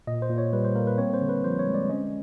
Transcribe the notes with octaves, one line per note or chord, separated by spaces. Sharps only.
A#2 D#5
C5
A#2
C#5
G3 B4
C5
A#3 A#4
B4
C4 C#5
C5
D3
B4
F3 C5
C#5
G#3
D5
C#4 D#5